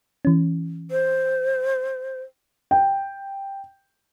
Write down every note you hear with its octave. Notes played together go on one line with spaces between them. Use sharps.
E3 C#4
C5
G5